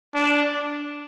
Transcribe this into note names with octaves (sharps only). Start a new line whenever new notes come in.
D4